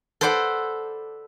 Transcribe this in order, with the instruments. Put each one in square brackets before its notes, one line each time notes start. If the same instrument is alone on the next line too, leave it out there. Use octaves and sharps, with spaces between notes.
[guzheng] A4 B4 C5 D5 F#5